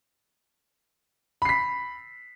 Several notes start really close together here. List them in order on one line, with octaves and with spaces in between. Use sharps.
B5 C7 B6